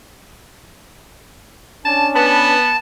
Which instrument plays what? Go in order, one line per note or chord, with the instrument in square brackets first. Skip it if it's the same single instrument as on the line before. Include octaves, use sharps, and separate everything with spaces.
[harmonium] C#4 D4 [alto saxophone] A5
[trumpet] B3 [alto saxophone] B4 [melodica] A5